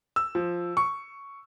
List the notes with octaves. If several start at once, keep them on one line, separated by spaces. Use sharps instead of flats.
E6
F3
C#6